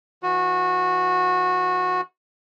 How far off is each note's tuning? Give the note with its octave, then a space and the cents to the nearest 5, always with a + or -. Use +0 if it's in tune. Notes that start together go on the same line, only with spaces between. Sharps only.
E3 +0 F#4 -20